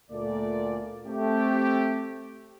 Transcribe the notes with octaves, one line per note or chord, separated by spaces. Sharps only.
D2 A#2 A3 D5
A3 C4 G4